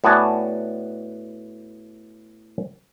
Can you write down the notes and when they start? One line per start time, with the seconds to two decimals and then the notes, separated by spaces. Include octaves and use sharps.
0.04 A2 B3 F#4 D5 G#5 A5